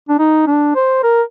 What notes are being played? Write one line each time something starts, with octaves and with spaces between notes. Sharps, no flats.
D4
D#4
D4
C5
A#4